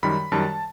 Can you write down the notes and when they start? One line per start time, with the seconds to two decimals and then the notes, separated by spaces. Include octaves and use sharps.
0.03 F#2 D#3 G3 B5
0.32 F#2 D#3 G3 A5